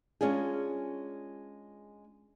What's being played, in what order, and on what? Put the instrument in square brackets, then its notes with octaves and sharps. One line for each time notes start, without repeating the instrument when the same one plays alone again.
[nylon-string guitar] G#3 C#4 D4 F4 G#4